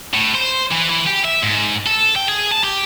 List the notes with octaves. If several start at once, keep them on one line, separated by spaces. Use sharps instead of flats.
A2
C5
E3
E3
G4
E5
G#2
A4
G5
G#4
A5
G4